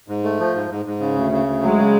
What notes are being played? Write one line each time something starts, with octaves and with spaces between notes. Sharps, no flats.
G#2
A3
F3
G#2
G#2
G#2
C#3
D2
C#3
D2
F#3 G#3
C#3